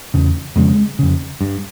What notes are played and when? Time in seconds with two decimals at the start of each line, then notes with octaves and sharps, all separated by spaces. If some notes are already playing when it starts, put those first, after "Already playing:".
0.14 E2 C#3
0.56 F2 C#3 G#3
0.99 F2 C#3
1.41 G2